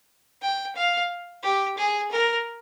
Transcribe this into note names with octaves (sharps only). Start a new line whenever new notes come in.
G5
F5
G4
G#4
A#4